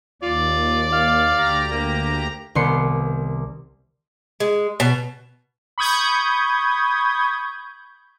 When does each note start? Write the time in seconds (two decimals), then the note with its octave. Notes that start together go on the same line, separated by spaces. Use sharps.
0.22 D#2 F4 D5
0.93 F5
1.36 D2 G4 A#5
1.71 A#3
2.55 C2 D#3 B3 C6 C#7
4.40 G#3
4.80 B2
5.78 B5 C#6 D#6 G6 G#6